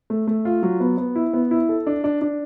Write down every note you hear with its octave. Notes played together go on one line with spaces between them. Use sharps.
A3
A3
F4
F#3
B3
B3
E4
B3
E4
A4
D4
D4
D4